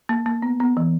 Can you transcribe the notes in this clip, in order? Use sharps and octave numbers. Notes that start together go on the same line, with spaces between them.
A#3
A#3
B3
B3
E3